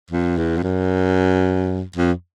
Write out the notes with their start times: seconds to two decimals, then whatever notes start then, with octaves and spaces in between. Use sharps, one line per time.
0.11 F2
0.37 E2
0.57 F2
0.63 F#2
1.96 F2